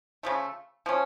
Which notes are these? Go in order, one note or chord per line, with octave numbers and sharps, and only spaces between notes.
C#3 F3 A3
F3 A3 C#4